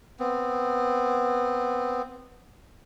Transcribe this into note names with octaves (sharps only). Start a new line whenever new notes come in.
B3 C4